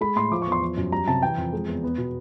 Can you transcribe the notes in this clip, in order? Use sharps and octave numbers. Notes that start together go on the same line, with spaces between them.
G#3 B5
A2 C6
F3 D6
C#6
E2
C6
F3
F#2
G3 A#5
C3 A5
E3 G5
F2
G#3
E2
B3
B2